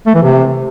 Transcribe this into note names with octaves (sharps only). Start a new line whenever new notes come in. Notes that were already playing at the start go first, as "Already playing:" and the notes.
A3
E3
C3